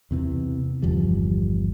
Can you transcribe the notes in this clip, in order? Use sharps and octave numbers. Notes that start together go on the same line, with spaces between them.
E2 C3 E3
G1 E2 F3 G3